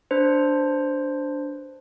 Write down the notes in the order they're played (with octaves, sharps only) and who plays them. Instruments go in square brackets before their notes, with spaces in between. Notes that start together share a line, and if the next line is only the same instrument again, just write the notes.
[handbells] D4 B4 C5